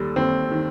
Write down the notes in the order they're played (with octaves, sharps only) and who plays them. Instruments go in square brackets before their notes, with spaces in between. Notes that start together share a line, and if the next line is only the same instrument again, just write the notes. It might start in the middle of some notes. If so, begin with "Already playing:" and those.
Already playing: [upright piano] D#2 G3 A4
D#2 C4
D#3